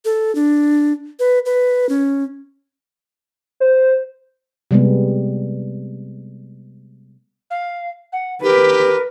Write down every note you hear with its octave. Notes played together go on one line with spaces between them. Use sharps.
A4
D4
B4
B4
C#4
C5
C3 G3 G#3 B3
F5
F#5
G4 A#4 B4